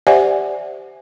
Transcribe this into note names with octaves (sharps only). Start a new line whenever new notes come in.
G4 C5 D5 E5 F#5 G#5